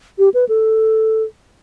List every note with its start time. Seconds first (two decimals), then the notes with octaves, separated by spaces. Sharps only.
0.19 G4
0.34 B4
0.49 A4